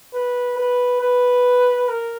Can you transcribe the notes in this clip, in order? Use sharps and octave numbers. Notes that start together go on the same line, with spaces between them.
B4
B4
B4
A#4